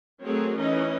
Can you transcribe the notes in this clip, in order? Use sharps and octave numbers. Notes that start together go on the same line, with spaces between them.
F#3 A3 C4 G#4 A#4 C#5
E3 C#4 D#4 D#5